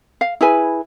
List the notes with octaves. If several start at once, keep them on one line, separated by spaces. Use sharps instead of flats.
F5
E4 G#4 B4 G#5